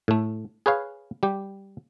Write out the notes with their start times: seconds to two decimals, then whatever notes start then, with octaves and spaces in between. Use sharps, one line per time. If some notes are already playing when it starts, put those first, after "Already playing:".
0.08 A2 A3
0.66 G#4 B4 C#5 F5
1.23 G3 G4